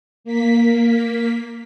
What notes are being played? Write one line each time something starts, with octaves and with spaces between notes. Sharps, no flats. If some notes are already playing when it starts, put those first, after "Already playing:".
A#3 B6